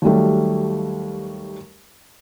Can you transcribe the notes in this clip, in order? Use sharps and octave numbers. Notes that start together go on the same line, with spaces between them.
D#2 F#3 G3 A3